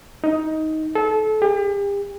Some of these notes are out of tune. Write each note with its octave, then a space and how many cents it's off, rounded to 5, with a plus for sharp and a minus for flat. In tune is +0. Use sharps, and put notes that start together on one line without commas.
D#4 +15
A4 -25
G4 +40